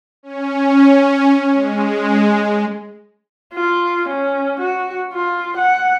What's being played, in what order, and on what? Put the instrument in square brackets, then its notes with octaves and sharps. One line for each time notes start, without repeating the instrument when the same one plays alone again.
[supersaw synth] C#4
G#3
[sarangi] F4
C#4
F#4
F4
F#5